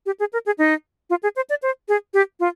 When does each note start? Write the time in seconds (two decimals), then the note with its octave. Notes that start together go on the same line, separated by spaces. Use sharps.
0.06 G4
0.20 G#4
0.33 A#4
0.46 G#4
0.58 D#4
1.10 F4
1.23 G#4
1.36 C5
1.50 D5
1.62 C5
1.88 G#4
2.14 G4
2.40 F4